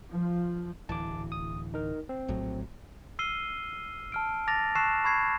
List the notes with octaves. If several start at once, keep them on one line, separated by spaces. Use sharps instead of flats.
F3
D1 E3 A5 D6
D#6
D#4 A#4
C4
A#1 A2 F#3
E6 F6 C7 D#7 G7
A5 F6 D7
A5 D6 A6 A#6 F7
A5 C#6 E6 F#6 C7 E7
B5 C#6 G#6 C7